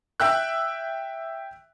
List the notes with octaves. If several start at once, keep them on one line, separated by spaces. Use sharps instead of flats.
E5 G5 E6 F#6